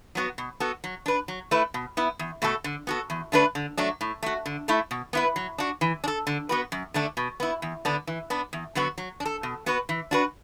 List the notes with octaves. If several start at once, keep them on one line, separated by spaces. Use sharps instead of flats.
F#3 B3 F#4
B2
B3 F#4 A4
F#3
D4 B4
F#3
A3 E4 B4
B2
B3 E4
E2
B2 A3 F#4 A4
D3
B3 F#4 A4
E2
D3 A3 D4 B4
D3
F#3 A3 D4
A2
A3 F#4
D3
A3 E4 A4
B2
B3 E4 B4
F#3
D4 F#4
E3
D4
A4
D3
B3 F#4 B4
F#2
D3 A3 D4
B2
B3 E4
E2
D3 B3 D4
E3
B3 D4
E2
D3 F#3 B3 F#4
F#3
D4
A4
B2
B3 F#4 B4
E3
D4 F#4 B4